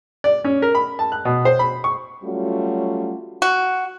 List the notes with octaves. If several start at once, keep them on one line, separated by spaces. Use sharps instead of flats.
D5
C#4
A#4
B5
A5
F#6
B2
C5
B5
C#6
F#3 G3 A3 C#4 F4 F#4
F#4